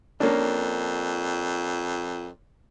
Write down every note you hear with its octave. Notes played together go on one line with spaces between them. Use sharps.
F2 A#3 C#4 D4